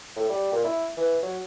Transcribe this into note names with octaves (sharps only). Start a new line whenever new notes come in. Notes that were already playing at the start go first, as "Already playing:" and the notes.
A2
G3
A#2
E4
E3
F#3